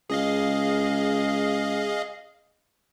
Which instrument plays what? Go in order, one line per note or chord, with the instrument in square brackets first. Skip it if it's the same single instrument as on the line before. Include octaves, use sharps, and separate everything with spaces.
[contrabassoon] C#2 [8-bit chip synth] G#4 D#5 F5